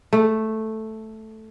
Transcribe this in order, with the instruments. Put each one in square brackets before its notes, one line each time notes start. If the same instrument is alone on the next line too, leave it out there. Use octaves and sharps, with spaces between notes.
[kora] A3